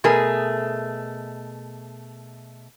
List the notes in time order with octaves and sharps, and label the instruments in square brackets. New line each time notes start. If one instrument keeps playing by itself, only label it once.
[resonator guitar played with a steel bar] B2 A3 G#4 A#4 G#5